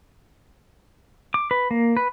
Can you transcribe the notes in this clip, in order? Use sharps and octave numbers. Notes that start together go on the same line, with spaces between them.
D6
B4
A#3
B4